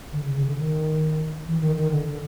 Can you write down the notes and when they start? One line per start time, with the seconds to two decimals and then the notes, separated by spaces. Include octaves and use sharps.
0.12 D3
0.24 C#3
0.35 C#3
0.45 D3
0.58 D#3
1.46 E3
1.61 D#3
1.77 D#3
1.91 D3
2.06 D3